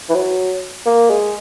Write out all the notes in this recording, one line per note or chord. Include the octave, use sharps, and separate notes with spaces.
E3
F#3
A#3
G#3